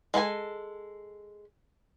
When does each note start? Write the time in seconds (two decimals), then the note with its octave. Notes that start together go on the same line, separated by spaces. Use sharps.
0.14 G#3 A4 B4 G#5